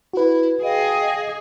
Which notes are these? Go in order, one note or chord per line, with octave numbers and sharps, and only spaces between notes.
E4 F#4 B4
G#4 D#5 F5 G5